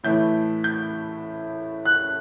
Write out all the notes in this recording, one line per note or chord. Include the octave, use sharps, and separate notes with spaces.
A2 E3 A3 E4 G6
G6
F#6